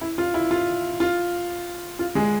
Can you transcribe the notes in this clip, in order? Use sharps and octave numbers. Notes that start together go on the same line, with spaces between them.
E4
F4
E4
F4
F4
F4
G#3 G#4